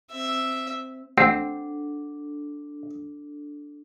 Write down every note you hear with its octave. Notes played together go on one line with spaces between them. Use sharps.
C4 E5
A1 C4 D4 A4 F#5